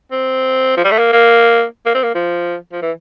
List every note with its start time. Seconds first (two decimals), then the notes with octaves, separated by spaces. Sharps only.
0.12 C4
0.77 F3
0.85 G3
0.91 A3
0.98 A#3
1.13 A#3
1.86 A#3
1.94 C4
2.03 A#3
2.15 F3
2.73 F3
2.82 E3